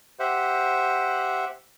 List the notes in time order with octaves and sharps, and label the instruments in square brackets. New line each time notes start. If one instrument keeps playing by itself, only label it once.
[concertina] G4 C5 E5 F#5